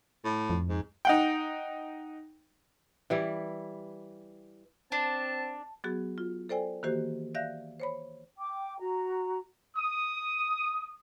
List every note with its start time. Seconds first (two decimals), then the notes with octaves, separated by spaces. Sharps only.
0.24 A2
0.50 F2
0.69 G#2
1.05 D#4 F#5 G5
3.10 E3 G3 E4
4.92 C4 D4 A5
5.84 F#3 B3 F#4 G#4
6.18 F4
6.49 A4 C5 D5 G5 G#5
6.83 D#3 E3 A#3 F#4 G4 C5
7.35 D5 E5 F5 F#6 G6 A#6
7.80 C5 C#5 B5
8.38 G5 D6
8.79 F#4 A#5
9.76 D#6